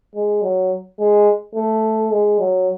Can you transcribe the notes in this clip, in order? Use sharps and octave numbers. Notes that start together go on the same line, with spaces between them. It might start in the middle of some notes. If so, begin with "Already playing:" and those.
G#3
F#3
G#3
A3
G#3
F#3